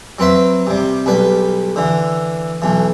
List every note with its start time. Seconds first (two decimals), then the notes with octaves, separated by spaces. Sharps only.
0.19 F#3 C4 B4 E5
0.67 C3 G3
1.06 B1 G3 B4
1.76 D3 E3
2.62 B1 E3